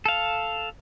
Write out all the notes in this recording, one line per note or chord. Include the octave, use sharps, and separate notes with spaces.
A4 F5